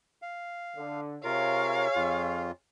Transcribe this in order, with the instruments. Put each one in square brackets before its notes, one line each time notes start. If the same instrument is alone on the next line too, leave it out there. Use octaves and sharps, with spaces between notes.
[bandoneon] F5
[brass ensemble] D3
[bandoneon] C3 F4 A#4 [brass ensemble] G#4 C#5 [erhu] F5
[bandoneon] F2 F4